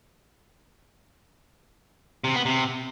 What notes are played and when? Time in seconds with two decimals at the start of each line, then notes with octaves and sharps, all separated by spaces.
2.24 C3
2.35 B3
2.45 C3